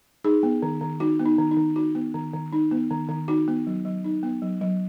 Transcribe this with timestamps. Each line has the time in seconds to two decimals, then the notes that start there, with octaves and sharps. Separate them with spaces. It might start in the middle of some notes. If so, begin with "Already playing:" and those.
0.24 D#4 G#4
0.43 B3
0.62 D#3
0.81 D#3
1.00 D#4 F#4
1.20 B3
1.26 D#4
1.38 D#3
1.51 D#4
1.57 D#3
1.76 D#4 F#4
1.95 B3
2.14 D#3
2.33 D#3
2.53 D#4
2.71 B3
2.91 D#3
3.09 D#3
3.28 D#4 F#4
3.48 B3
3.67 F#3
3.85 F#3
4.04 D#4
4.23 B3
4.42 F#3
4.61 F#3